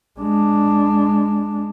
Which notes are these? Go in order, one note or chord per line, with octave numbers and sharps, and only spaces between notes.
G#3 D4